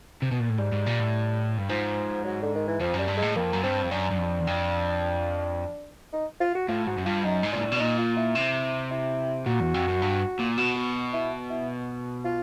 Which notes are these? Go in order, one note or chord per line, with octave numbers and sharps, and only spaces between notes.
C3
B2
A#2
A2
G#2 G3
G#2
A#2
A2
G2
G#2 F3
F#3
D3
D#3
E3
F2 F3
F#2
G3
G2
G#3
A2
F2 A#3
F#2
G2 C4
F2
F#2 D4
F#2
F2
E2
F2
D#4
F4
F#4
A2 F4
G#2 F#4
F#2
G2 F4
F#2 D#4
G#2
A#2 D4
A2
B2
D4
A#2 D#4
F4
E4
C3
E4
A#2 F#4
E2
F2
F#2
G2
A#2
B2 F#4
F#4
E4
E4
F4